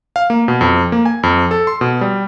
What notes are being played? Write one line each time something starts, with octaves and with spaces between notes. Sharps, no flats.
F5
A#3
B2
F2
A#3
G#5
F2
A4
C6
B2
G3